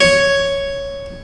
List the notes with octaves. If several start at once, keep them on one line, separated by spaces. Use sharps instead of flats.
C#5